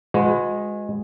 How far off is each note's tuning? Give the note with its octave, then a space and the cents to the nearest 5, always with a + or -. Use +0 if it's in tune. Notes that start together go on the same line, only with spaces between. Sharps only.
G#3 +0 F#4 -40 B4 +35